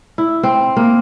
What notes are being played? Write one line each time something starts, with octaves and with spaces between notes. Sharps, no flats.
E4
C4
A#3